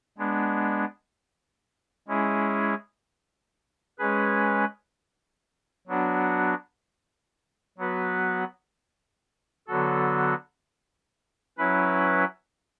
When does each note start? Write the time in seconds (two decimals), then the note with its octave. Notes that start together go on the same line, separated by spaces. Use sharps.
0.18 G#3 B3 D4
2.08 G#3 C#4 E4 G#4
3.99 G#3 C#4 G#4 B4
5.87 F#3 B3 D4 F#4
7.78 F#3 B3 F#4 B4
9.67 D3 F#3 B3 F#4 A4
11.58 F#3 C#4 E4 B4